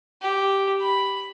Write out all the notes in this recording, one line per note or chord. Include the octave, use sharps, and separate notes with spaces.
G4
B5